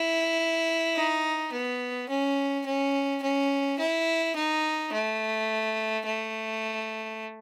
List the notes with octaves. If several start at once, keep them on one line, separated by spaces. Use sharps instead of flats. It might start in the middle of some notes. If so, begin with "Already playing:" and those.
Already playing: E4
D#4
B3
C#4
C#4
C#4
E4
D#4
A3
A3